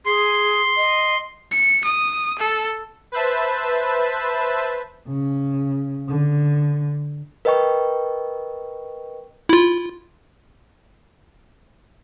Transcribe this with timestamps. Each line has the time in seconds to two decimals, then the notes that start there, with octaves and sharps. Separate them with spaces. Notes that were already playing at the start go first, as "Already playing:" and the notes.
0.06 G#4 C6
0.77 D#5
1.52 C#7
1.84 D#6
2.39 A4
3.12 B4 C5 E5 A5
5.08 C#3
6.08 D3
7.45 A#4 B4 D#5 G5 C#6
9.49 E4 F4